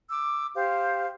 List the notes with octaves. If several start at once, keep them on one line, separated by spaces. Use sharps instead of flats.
D6 E6
G4 C5 F5